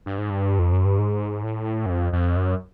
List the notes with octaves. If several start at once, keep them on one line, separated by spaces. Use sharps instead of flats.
G2
G#2
G2
F2
F#2
G2
G#2
A2
F#2
F2
F2
F#2